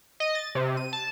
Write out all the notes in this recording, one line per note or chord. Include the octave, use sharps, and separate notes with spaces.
D#5
A6
C3
D#7
A5